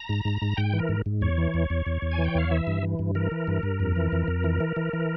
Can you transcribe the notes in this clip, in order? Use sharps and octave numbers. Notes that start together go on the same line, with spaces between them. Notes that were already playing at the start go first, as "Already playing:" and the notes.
Already playing: A#5
G#2
G#2
G#2
G#2 G5
E3
A#4
G#2
G#2
E2 C#5
E3
E2
E2
E2
E2
G#5
E3
G5
E2 F5
E3 E5
G2
E3
G2
E3 A#4
E3
G2
G2
F2
E3
F2
F2
E3
E3
E3
E3